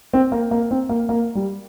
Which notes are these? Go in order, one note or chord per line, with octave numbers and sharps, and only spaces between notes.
C4
A#3
A#3
C4
A#3
A#3
G3